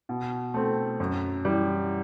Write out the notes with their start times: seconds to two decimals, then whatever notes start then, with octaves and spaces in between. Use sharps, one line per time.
0.09 B2
0.54 A3 C4
1.00 F#2
1.45 E3 G3